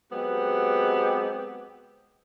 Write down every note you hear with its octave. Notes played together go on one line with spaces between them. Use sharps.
F#3 G#3 B3 C4 G4